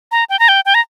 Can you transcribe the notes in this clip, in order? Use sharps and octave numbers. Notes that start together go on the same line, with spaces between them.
A#5
G5
A#5
G5
G5
A#5